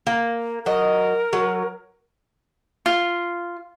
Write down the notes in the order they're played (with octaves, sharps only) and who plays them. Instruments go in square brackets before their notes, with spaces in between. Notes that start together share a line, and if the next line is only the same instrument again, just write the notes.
[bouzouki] A#3
[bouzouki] F#3 D#5 [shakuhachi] A#4
[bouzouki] F#3
[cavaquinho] F4